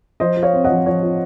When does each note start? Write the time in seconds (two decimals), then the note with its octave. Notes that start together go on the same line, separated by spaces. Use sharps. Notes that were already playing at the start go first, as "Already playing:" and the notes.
0.20 F3 C5 D#5
0.37 F4
0.43 C#5 F5
0.53 C4
0.64 D#5 F#5
0.70 F3
0.86 F3 C#5
1.03 F4